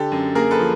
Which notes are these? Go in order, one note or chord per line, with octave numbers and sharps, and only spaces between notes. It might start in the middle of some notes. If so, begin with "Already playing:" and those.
Already playing: D3 G4 A4
F#2
A#3 G#4 A#4
A4 B4
F3